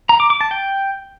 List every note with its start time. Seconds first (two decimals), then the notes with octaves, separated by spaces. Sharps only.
0.09 A#5
0.20 D6
0.30 D6
0.41 A5
0.51 G5